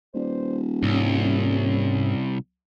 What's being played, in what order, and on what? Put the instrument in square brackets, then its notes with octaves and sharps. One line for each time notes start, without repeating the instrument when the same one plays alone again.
[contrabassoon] D#1 [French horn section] B4 C5 D5
[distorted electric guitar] C2 [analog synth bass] G#2 [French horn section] C#4